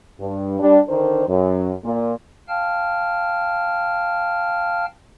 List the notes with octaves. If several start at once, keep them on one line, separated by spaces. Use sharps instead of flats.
G2
G3 D4
D3 D#3 D4 A#4 C5
F#2
A#2
F5 G5 A5 F6